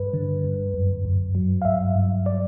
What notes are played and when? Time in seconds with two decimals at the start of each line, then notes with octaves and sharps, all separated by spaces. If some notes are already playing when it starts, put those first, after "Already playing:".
Already playing: G2 B4
0.14 D3
0.44 G2
0.74 F#2
1.05 F#2
1.35 F#3
1.62 F5
1.65 G2 E5
1.96 G2
2.26 D5